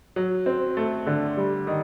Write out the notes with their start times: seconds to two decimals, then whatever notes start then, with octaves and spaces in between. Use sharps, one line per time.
0.16 F#3
0.46 C4
0.77 A3
1.07 D3
1.37 G3
1.67 D#3